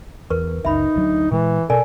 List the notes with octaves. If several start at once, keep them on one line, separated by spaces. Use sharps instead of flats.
E2 A#4 B4 C#6
F#1 C#2 D#4 E5 B5
D2 F#3 D4
A#2 E3 G#3
B2 A4 A#4 D5 G#5